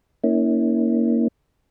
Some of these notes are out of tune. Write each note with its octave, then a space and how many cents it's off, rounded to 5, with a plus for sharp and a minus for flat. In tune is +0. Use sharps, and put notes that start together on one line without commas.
A#3 +0 C#4 +10 E4 -35